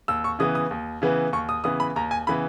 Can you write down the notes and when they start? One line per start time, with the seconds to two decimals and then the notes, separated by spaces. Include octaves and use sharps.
0.08 D#2 E6
0.24 C#6
0.39 C#3 E3 B3 D#6
0.55 D#6
0.71 D#2
1.02 C#3 E3 B3
1.33 D#2 C#6
1.49 D#6
1.64 C#3 E3 B3 D#6
1.80 B5
1.96 D#2 A#5
2.11 G#5
2.27 C#3 E3 B3 B5